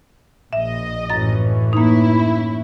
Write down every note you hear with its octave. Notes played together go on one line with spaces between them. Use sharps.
A#1 D#5 E5
F#2 A2 E3 C#4 A6
A#3 D#4 E4